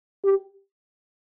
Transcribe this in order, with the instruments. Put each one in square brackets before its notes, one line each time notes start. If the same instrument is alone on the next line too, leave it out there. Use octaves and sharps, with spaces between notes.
[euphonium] G4